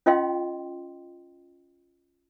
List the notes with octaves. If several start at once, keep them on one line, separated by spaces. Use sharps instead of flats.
C#4 F4 D#5 F5 G5 C6